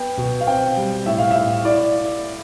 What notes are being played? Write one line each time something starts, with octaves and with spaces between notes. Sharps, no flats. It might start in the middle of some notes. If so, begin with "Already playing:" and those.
Already playing: B3 G5
B2
F5
C4 G5
G3
A2 E5
F5
A2 E5
E4 D5